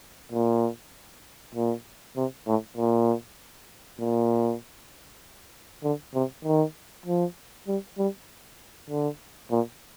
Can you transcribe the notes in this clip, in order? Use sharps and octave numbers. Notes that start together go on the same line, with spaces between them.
A#2
A#2
C3
A2
A#2
A#2
D3
C3
D#3
F3
G3
G3
D3
A#2